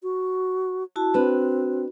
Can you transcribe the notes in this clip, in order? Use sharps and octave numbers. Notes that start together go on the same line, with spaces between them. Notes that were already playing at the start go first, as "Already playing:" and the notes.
F#4
E4 F#4 A5
C4 D4 F#4 B4